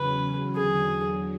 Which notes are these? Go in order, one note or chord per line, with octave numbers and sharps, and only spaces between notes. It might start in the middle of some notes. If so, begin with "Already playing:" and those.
Already playing: E2 C#3 F#3 C#4 B4
E2 D3 F#3 G#4